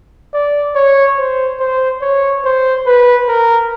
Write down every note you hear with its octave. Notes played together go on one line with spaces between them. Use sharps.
D5
C#5
C5
C5
C#5
C5
B4
A#4